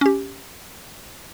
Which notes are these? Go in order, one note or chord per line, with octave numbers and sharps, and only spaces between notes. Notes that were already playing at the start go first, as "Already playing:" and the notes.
C#4 G4